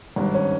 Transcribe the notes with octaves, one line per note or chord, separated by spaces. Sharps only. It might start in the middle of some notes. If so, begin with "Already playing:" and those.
G#1 G2 D#3
C#4